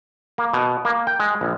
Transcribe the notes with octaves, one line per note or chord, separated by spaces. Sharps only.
A#3
B2
A#3
G5
G#3
A#1